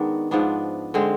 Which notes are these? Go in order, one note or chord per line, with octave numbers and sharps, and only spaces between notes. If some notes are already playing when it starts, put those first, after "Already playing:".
Already playing: D#3 G#3 B3 D4
G#2 F3 B3 D4
D3 G#3 C4